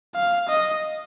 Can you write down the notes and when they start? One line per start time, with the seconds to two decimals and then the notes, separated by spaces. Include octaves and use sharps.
0.16 F5
0.49 D#5